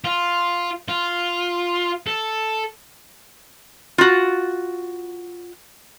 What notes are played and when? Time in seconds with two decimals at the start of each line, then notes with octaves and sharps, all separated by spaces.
0.05 F4
0.88 F4
2.07 A4
3.98 F4 F#4